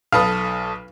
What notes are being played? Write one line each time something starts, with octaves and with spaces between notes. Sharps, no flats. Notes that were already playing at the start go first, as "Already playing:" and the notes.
B1 A4 B4 F5 D#6